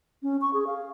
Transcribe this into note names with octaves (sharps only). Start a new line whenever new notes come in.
C#4
C#6
G#4
F5